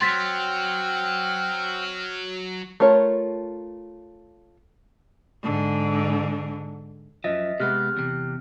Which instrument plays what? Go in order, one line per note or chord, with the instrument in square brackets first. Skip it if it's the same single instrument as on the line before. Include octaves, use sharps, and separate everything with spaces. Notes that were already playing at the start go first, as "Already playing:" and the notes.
[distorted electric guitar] F#3 [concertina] C4 F#5 G5 [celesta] C6 A6 B6 [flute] F6
[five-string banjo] A3 F4 A#4 C#5
[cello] G#2 D3
[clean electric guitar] F#2 F3 [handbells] D#5 E5 A6
[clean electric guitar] C3 G#3 B3 [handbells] G4 F6 F#6
[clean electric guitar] E2 C3